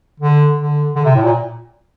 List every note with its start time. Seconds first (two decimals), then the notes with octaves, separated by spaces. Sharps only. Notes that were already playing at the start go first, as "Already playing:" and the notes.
0.20 D3
0.58 D3
0.96 D3
1.05 C3
1.15 A2
1.24 A#2